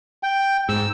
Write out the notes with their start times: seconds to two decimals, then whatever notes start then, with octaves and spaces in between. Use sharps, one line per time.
0.23 G5
0.69 G#2 E6